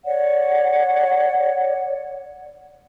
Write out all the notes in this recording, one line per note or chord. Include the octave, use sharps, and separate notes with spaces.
C#5 D5 F#5